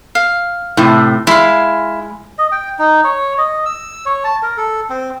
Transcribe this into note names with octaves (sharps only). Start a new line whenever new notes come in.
F5
A2 C3
G#3 E4 F5
D#5
G5
D#4
C#5
D#5
E6
C#5
A5
A#4
A4
C4